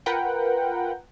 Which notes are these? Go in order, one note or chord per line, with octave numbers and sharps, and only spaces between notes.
F4 A#4 B4 F#5 G5